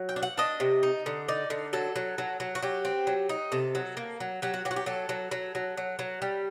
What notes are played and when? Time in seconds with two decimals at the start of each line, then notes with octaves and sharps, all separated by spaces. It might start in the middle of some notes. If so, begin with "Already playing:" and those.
Already playing: F#3
0.09 G5
0.16 D4
0.23 F#5
0.38 D4 D#5
0.60 C3
0.83 D#4
1.06 D3
1.28 D#4 D5
1.50 D3
1.73 F#3 A4
1.96 F#3
2.18 F#3
2.40 F#3
2.55 F#4
2.62 F#3 G4
2.85 C4
3.07 F#3
3.29 D#4
3.52 C3 A4
3.75 F#3
3.97 A#3
4.20 F#3
4.42 F#3 G4
4.54 F#4
4.65 F#3 G4
4.71 F#4
4.76 G4
4.86 F#3 A4
5.09 F#3
5.31 F#3
5.55 F#3
5.77 F#3
5.99 F#3
6.22 G3